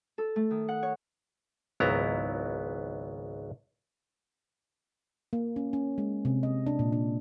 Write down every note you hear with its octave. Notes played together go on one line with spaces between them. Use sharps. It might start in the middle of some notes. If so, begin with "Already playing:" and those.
A4
A3
D#3
F#5
C#5
G#1 C#2 F#3 B3 E4 A#5
A#3
C#4
C#4
G#3
C3
D#5
D4
A#2
D4